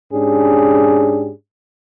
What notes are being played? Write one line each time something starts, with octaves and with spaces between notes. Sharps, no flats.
G#2 C#4 D4 G4 G#4